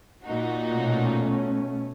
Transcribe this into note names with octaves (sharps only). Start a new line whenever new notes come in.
A#2 D#4 F#4
B2 A3 C#4